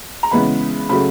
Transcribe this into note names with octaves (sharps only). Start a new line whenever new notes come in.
A#5
C#3 E3 G#3 B3 B5
C#3 F#3 A3 B5